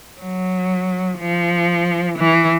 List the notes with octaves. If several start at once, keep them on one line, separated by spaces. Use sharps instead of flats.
F#3
F3
E3